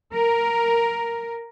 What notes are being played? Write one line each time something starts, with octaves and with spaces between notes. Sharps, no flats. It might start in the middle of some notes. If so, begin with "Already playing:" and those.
A#4